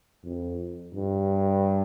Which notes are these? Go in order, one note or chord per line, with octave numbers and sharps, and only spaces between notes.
F2
G2